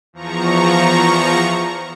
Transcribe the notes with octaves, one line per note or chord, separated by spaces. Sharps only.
E2 F3 A#5 C#6